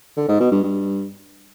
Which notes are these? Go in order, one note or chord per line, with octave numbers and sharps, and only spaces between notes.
D3
G#2
B2
G2
G2